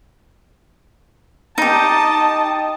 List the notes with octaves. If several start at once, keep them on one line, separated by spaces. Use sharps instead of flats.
D#4 G4 D#5 A5